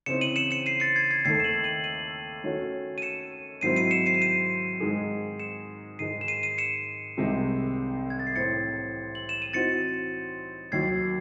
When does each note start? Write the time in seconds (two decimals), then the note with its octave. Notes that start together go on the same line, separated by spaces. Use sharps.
0.06 C#3 E3 C4 D#4 C#7 E7
0.21 D#7 F#7
0.36 C#7 E7
0.51 C#7 E7
0.66 C7 D#7
0.80 A6 C#7
0.96 G#6 C7
1.11 G#6 C7
1.25 D#2 D#3 A3 G#6 C7
1.40 E7
1.44 D#7 F#7
1.64 D#7 F#7
1.84 D#7 F#7
2.44 D#3 A3 C#4 F#4 C#5
2.98 D#7
3.02 C#7 E7
3.61 G#2 D#3 F#3 C4 E4 C7 D#7
3.76 C7 D#7
3.91 C#7 E7
4.06 C7 D#7
4.14 E7
4.21 C7 D#7
4.80 G#2 D#3 G#3 D#4 G#4
5.40 C#7 E7
5.99 G#2 D#3 G#3 C7 D#7
6.21 E7
6.28 C7 D#7
6.43 C7 D#7
6.58 C#7 E7
7.17 C2 C3 D#3 G#3
8.10 G#6
8.20 A6
8.27 C7
8.35 A2 E3 C4 A6 C#7
9.15 F#7
9.29 E7
9.42 D#7
9.53 E3 C4 D#4 F#4 A6 C#7
10.72 D#2 D#3 F#3 G#6 C7